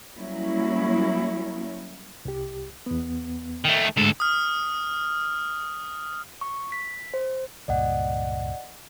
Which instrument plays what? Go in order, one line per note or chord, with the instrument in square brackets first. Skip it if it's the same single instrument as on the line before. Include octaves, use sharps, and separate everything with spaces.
[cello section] F#3 G3 A#3 C#4 E4
[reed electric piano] C2 G4
E2 B3
[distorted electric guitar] D#3 A3
[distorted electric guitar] D2 A4 [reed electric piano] G#2 G#3
[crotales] D#6 F6
[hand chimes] C#6
B6
C5
[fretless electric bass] C#2 G2 A#2 [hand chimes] D5 D#5 F#5